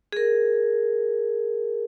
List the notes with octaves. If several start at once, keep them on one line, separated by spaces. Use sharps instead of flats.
G#4 A#4